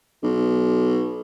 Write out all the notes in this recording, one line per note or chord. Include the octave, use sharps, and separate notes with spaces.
B1